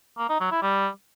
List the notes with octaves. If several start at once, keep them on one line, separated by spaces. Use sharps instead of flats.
A#3
D#4
F#3
E4
G3